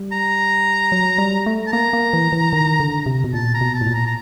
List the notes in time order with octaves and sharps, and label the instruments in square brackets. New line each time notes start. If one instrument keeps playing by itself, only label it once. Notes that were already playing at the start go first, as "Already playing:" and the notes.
Already playing: [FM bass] G3
[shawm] A#5
[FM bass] F#3
G3
A3
[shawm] A5
[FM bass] A#3 [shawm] A#5
[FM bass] A#3
E3
E3
D#3
D3
C3
B2
[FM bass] A#2 [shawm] A5
[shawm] A#5
[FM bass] B2
[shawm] A5
[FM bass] A2
A#2
[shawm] A#5
A#5